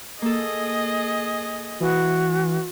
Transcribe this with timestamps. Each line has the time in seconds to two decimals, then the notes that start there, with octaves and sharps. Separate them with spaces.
0.22 A#3 G#4 A4 D#5
1.80 E3 F#4